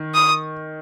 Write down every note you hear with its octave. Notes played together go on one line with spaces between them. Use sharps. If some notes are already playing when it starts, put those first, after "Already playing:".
Already playing: D#3
D#6